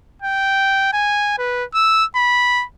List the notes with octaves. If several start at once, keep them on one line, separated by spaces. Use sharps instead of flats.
G5
G#5
B4
E6
B5